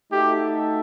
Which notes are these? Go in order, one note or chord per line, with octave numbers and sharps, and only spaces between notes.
A3 D#4 F#4 G4 A4 E5